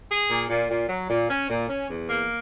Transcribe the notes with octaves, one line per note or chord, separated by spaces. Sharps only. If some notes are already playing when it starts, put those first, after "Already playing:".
G#4
A#2
A#2
A#2
F#3
A#2
C#4
A#2
C#4
E2
A#3